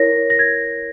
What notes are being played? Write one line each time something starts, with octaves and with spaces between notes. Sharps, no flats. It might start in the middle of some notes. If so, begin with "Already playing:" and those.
Already playing: E4 A#4 C#5 A#6
A#6
G#6